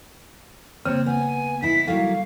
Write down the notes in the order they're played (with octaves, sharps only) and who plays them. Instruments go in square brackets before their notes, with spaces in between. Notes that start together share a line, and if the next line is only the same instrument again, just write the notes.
[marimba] C#3 A#3 [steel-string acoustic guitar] C4 [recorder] C#5
[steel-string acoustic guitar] B3 [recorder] G#5
[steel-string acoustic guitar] D#4 E4 [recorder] B6
[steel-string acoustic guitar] F#3 A#3 [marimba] G3 A4 [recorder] F5